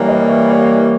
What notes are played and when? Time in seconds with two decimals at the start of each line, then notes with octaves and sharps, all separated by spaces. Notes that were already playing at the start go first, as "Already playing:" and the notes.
Already playing: E3 G3 A#3 A#4 C#5
0.08 B4 D#5
0.29 C#5 E5
0.49 C#5 E5